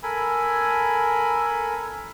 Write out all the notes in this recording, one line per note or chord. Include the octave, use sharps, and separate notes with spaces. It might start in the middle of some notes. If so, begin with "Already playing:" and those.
A4 A#4 G#5 B5